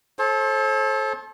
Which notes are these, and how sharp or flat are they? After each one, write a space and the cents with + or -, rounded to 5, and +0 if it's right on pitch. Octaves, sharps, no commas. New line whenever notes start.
A4 -25 C5 +40